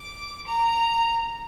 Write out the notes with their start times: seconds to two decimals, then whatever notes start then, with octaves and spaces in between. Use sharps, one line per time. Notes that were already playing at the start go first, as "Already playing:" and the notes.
Already playing: D6
0.45 A#5